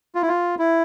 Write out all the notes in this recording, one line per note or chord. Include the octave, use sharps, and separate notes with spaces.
F4
E4
F4
E4